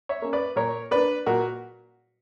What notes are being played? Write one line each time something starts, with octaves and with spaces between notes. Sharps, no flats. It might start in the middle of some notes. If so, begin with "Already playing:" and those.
C#5 E5
A#3 C#4
B4 D5
A#2 A#4 C#5
A#3 D4 B4 D5
A#2 F#4 A#4